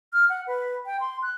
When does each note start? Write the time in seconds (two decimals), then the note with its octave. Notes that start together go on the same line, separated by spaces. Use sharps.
0.13 F6
0.29 F#5
0.47 B4
0.86 G5
1.00 C6
1.23 F#6